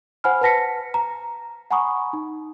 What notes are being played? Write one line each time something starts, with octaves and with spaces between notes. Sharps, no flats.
C5 F#5 G#5 B5 F6
B4 F#5 A5 A#6 B6 C#7
A#5
F#5 G#5 A#5 B5 C#6 D#6
D#4